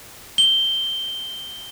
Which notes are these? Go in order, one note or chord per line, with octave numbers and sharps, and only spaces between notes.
G7